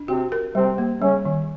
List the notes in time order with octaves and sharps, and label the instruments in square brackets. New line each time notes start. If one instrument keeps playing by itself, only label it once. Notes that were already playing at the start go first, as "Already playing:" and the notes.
Already playing: [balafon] D4
[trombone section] C3 C4 [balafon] F#4
[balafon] A#4
[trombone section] C3 C4 [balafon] G3
[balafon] A#3
[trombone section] C#3 C#4 [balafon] G3
[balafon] D#3